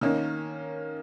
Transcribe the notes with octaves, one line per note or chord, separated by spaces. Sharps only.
D#3 A#3 C#4